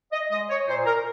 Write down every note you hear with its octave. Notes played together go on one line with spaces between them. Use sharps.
D#5
G#3 D#5
C#5
A#2 C5
A#4